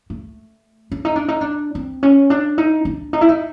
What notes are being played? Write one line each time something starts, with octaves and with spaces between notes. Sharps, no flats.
A3
D4
D#4
D4
D#4
D4
C4
C#4
D4
D#4
D4
D#4
E4
D#4